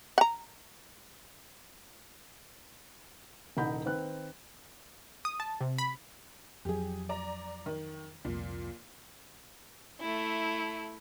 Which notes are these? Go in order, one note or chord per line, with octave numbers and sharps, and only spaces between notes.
F#5 A#5
D#1 C2 D#4 B5 G6
D#3 C4 B4 F#6
D#6
A5
C3
B5
F2 F#3 G4 G#4
D5 A#5
D#3
C2 F2 A#2
A3 E4